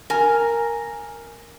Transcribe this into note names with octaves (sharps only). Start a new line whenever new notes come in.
A#4 G#5